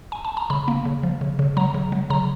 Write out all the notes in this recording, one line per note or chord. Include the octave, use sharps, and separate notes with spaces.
G#5
A5
A#5
C#3 B5
A#3
C#3
F3
C#3
C#3
F#3 A#5
C#3
F#3
C#3 A#5